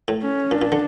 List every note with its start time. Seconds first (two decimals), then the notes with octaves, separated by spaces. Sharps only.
0.08 A2
0.23 C#4
0.51 A#2 D4
0.62 A#2
0.72 D3